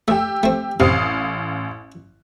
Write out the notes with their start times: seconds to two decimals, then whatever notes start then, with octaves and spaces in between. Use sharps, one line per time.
0.08 A3 G4 E6
0.43 A3 C4
0.80 A1 C3 F5 D#6